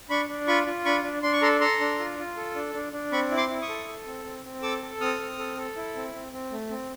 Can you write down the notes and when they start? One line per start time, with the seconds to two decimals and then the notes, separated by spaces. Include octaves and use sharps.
0.10 D4 B5 C#6
0.29 D4
0.47 F4 B5 C#6
0.67 F4
0.85 D4 B5 C#6
1.04 D4
1.23 D4 C6
1.33 C#6
1.42 A4 A#5 C6
1.60 A4 A#5 C6
1.80 D4
1.99 F4
2.18 F4
2.37 A4
2.55 D4
2.74 D4
2.93 D4
3.12 C4 B5 C#6
3.31 E4
3.37 C6 D6
3.49 E4
3.62 C#6 D#6
3.69 A4
3.88 A4
4.06 C4
4.25 C4
4.44 C4
4.62 A4 D6 E6
4.82 A4
5.00 C4 D#6 F6
5.20 C4
5.38 A4
5.57 A4
5.77 E4
5.96 C4
6.14 C4
6.32 C4
6.52 A3
6.70 C4